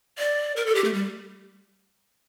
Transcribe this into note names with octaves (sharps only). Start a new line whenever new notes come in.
D5
A#4
A4
G4
A3
G3